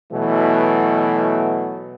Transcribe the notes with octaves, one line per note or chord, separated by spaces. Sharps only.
B2 E3 F#3 A3